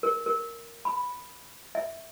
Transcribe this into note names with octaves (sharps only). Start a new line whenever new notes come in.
A#4
A#4
B5
E5